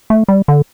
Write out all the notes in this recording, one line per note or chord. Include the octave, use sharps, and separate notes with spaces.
A3
G3
D3